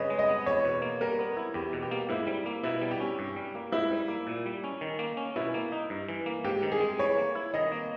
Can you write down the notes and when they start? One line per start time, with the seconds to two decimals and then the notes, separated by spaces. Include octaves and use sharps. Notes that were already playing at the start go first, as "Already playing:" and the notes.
Already playing: C#3 B4 C#5 D#5
0.10 G#3
0.19 D#5
0.28 B3
0.46 E2 C#5
0.65 B2
0.82 A#3
1.01 G3 A#4
1.19 B3
1.37 E4
1.54 E2 G4
1.73 B2
1.82 G4
1.91 A#3
2.09 G#2 E4
2.27 G3
2.46 A#3
2.63 B2 E4
2.82 G3
2.91 G4
3.00 C#4
3.19 G2
3.36 G3
3.55 A#3
3.72 G#2 E4
3.91 G3
4.08 A#3
4.27 A#2
4.46 G3
4.64 C#4
4.81 D#3
4.99 A#3
5.17 C#4
5.36 B2 E4
5.54 A#3
5.72 D#4
5.90 G2
6.09 E3
6.26 A#3
6.45 G#2 G4
6.63 D#3
6.72 G#4
6.81 G#3
6.99 E3 C#5
7.17 A#3
7.35 E4
7.54 D#3 D#5
7.72 A#3